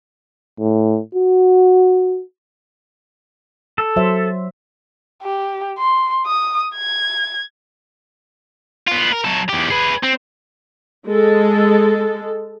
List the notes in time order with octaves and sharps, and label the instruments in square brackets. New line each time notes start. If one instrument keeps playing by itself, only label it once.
[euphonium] A2
F#4
[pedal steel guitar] A4
[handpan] F#3 C5 E5
[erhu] G4
C6
D#6
G#6
[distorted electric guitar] B3 F4
A#4
F#3 A4
E2 G4
G#4 B4
C4
[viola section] G#3 A4